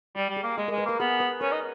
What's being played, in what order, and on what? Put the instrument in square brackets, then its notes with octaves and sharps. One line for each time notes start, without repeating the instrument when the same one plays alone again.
[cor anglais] G3 [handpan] G4
[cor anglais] G3
[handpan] G#4
[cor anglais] A#3
[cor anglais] G#3 [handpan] G#4
[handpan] A#4
[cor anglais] G#3
[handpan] B4
[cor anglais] A#3 [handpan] A#4
[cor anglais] B3 [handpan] G#4
[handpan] B4
[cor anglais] C#4 [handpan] A#4
[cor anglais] D#4